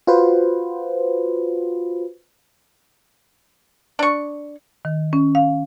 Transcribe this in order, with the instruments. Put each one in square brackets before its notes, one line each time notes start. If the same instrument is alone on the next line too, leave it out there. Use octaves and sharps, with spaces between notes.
[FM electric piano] F4 F#4 B4 C5
[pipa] D4 C#6
[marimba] D#3
C#4
F5